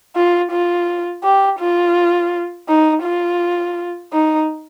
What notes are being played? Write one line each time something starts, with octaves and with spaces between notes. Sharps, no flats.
F4
F4
G4
F4
D#4
F4
D#4